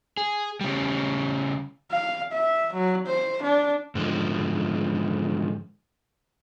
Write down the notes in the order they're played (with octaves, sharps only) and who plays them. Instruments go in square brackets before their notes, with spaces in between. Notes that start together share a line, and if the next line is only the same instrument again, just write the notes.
[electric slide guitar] G#4
C#3 G3
[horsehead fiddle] F5
E5
F#3
C5
D4
[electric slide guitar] G#2 D3 F3